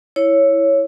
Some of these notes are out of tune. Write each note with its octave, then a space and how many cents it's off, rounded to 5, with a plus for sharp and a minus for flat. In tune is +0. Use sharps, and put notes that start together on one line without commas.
E4 +0 C#5 +0